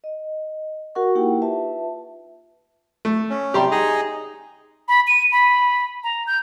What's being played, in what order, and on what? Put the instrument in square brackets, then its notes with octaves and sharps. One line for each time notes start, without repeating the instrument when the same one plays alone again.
[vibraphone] D#5
F#4 A#4 F#5 C#6
A#3 D#4 E4 G4 F#5 G5
F4 B4 E5 A5
[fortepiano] A3
[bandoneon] C#4
[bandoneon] C3 G3 [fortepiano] G4 A#5 C6
[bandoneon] D#4 G#4 D#5
[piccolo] B5
D#7
B5
A#5
G6